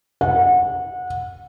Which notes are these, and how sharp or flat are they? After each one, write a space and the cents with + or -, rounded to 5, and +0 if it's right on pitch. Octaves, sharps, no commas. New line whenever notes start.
F#5 -25